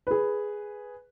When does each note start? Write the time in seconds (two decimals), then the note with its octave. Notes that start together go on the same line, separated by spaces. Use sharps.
0.07 G#4 B4